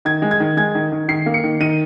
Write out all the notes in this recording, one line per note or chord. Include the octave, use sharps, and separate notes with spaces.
D#3 G#6
G#3
G#6
D#3
G#3 G#6
D#3
D#3
D#3 C7
A#3
C#7
D#3
D#3 D#7